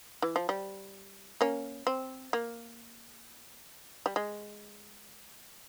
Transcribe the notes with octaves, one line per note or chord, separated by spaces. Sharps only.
E3
F3
G3
A#3 C#4
C4
A#3
G3
G#3